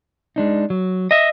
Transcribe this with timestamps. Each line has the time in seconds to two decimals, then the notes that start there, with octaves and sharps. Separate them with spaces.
0.36 G#3 D4 D#4
0.70 F#3
1.11 D#5 E5